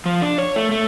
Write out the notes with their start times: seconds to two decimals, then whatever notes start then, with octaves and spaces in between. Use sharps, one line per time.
0.06 F3
0.22 D4
0.38 C#5
0.56 A3
0.71 A3